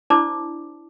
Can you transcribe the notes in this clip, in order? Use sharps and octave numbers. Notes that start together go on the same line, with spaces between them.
D4 E4 C5 D5 A5 D6